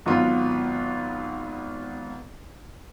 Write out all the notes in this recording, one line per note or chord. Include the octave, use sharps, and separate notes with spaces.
G#1 F#3 B3 F4